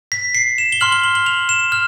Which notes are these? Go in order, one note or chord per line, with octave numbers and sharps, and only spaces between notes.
B6
C7
E7
G7
C6 F6 F#7
G7
F#7
F#7
F7
E7
F6